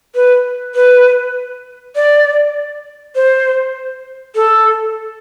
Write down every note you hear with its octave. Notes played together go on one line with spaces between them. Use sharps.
B4
B4
D5
C5
A4